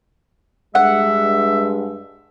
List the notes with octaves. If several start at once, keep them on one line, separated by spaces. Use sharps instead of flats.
G2 G#3 E5 F#5